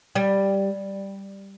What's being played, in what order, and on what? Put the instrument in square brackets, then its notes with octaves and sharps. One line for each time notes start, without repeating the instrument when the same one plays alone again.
[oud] G3